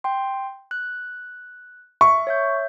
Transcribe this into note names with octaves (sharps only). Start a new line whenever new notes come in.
G5 C6
F#6
E5 C#6
C#5 E5 G6